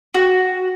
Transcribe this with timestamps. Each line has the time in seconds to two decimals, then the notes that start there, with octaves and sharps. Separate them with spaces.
0.14 F#4